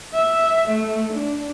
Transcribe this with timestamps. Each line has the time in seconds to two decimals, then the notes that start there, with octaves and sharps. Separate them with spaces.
0.13 E5
0.69 A3
1.13 D4